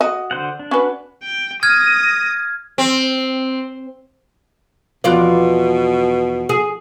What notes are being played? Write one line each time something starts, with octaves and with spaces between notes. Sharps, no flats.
F#4 D#5
D3 C5 F#5
D4
C#4 F#4 B4
G5
D#6 F6 G#6 A#6
C4
E2 B2 F3 F4 D5 F#6
G#4